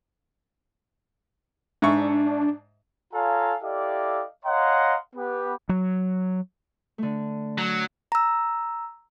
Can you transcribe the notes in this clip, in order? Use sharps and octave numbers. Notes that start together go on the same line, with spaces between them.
G#2 D4 E5 C#6
F4 A4 C#5 F5 G#5 A#5
E4 G4 A4 D5 D#5 F5
C#5 D#5 F5 F#5 A#5 C6
B3 G4 B4
F#3
D3 A3
F#3
A#5 E6